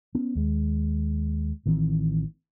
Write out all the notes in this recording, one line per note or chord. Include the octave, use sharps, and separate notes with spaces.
B3 C#4
D#2 G#3
A1 D#3 E3 C4